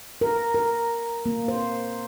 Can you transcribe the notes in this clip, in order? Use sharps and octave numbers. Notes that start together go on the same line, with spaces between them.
A#4
A#4
A#3
C5